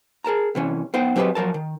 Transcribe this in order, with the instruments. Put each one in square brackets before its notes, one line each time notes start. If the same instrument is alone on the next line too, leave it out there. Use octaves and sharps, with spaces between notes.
[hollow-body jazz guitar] G#4 A#4 A5 A#5
C3 E3 C#4
B3 D#4 C5 F#5 G5
F#3 C4 G4 G#4 B4 D#5
F3 F#3 A#4 A5
D#3